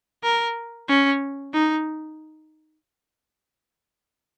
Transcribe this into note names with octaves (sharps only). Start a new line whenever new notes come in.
A#4
C#4
D#4